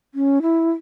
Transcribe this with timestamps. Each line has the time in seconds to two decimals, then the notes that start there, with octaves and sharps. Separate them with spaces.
0.14 C#4
0.42 E4